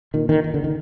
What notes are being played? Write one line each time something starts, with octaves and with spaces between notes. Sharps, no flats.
A#2 D#3
D#3
D#3
D3
D#3